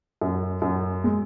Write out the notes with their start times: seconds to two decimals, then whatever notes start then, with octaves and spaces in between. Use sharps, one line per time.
0.21 F#2
0.62 F#2
1.04 G#3